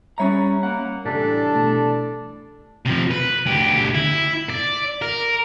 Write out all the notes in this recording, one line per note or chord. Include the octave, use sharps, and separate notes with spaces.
G3 C#4 C#5 E5 A#5 B5
A#3 F#5
A2 C3 E3 G3 D4 A4
B2 A3
C3 F3
B4
D2 G4
E4
D5
A#4